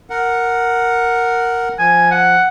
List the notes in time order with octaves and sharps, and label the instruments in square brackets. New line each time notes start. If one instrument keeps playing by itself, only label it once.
[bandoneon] A#4 F#5
[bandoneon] F3 [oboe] G#5
[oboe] F#5